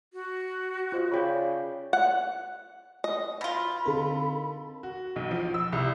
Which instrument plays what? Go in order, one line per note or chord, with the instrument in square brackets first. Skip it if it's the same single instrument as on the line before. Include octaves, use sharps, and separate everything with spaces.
[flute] F#4
[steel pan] F4 C5 D#5
[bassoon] C#3 [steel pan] D5 G5 B5
[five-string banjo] F#5
D#5
[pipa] B2 F4 [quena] B5
[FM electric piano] D3 C4 A#4 [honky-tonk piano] D#4 A4
[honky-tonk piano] F#4
B1
F3
E6
C2